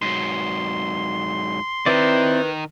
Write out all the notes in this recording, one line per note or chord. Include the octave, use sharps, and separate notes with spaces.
G#2 F#3 C6
D#3 C4 E4 A#4 B4 D5